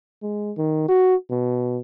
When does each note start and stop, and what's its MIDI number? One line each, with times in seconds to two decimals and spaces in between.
0.22 0.52 56
0.57 0.84 51
0.89 1.15 66
1.30 1.79 47